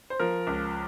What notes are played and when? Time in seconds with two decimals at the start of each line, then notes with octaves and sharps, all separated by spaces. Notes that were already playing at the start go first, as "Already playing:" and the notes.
0.10 C5
0.20 F3 A#4
0.47 C#2